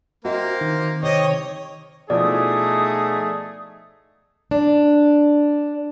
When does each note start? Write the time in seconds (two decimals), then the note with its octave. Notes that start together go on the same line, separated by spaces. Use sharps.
0.25 A#3 C4 F#4 C5 D#5 E5
0.61 D#3
1.03 C3 G4 C#5 D#5
2.10 B2 F3 A3 D#4 E4 G#4 D5 D#6
4.51 D4